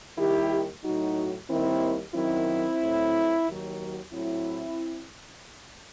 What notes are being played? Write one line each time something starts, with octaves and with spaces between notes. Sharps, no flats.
D#2 D#3 G3 E4 G4
A2 F#3 D#4 F#4
D#2 D#3 G3 C4 E4
F#2 D#3 F#3 C4 E4
A2 F#3
D#2 D#3 F#3
A2 F#3 C4 E4